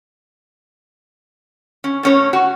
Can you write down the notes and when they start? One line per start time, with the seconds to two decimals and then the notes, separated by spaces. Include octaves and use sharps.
1.84 C#4
2.03 A2 C#4 C#5
2.33 F#4